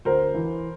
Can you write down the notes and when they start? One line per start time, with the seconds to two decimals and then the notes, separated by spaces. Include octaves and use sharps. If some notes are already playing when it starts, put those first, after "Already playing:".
0.05 D2 A#4 C5
0.34 E3